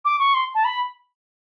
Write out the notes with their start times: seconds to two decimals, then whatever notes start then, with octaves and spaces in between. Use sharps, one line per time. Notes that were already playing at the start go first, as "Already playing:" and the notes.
0.05 D6
0.19 C#6
0.34 C6
0.55 A5
0.65 B5